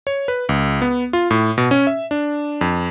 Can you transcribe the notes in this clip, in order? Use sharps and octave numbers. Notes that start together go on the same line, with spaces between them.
C#5
B4
C#2
B3
F4
A2
B2
C#4
E5
D4
F2